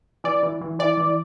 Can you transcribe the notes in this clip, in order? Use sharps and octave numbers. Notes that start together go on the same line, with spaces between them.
E3 D5
E3
E3
E3 D5
E3